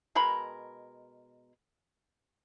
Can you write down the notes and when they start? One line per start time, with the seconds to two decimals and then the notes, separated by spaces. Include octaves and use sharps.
0.15 B2 G#3 A#4 B5